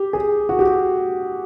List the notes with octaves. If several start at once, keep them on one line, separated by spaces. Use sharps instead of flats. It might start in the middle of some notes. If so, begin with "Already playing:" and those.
Already playing: G4
G#4
F#4
G4